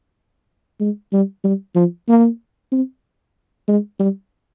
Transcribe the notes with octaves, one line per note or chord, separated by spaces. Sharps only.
G#3
G3
G3
F3
A#3
C4
G#3
G3